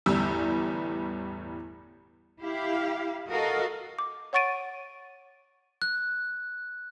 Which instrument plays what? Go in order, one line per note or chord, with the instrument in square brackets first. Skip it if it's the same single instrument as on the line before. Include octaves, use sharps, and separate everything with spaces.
[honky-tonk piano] G1 E2 A2 G3 E6
[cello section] E4 G4 F5
F#4 A4 A#4 D#5 F5
[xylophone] D6
C#5 F#5 C#6 A6 D7 D#7
[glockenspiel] F#6